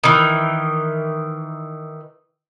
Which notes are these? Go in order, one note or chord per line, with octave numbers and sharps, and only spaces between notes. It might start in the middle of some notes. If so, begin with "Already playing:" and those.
D#3 E3